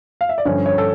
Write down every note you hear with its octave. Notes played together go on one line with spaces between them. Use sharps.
F5
E5
D5
G2 D3 F3 C#4 C#5
C#5
A4